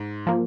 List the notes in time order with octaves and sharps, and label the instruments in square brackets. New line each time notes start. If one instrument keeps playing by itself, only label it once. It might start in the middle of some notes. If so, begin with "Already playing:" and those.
Already playing: [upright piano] G#2
[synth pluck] F3 A#3